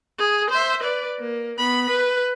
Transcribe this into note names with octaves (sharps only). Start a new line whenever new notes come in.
G#4
C5 E5
B4 D5
A#3
B3 B5
B4